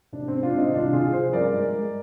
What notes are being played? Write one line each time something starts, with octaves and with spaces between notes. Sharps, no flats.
C3 D4
G#3 C4
D4 F4
C3 C4 D#4
C2 D4 F4
C2 F4 G#4
F3 G#4 C5
G2 A#4 D5
G#3
G#3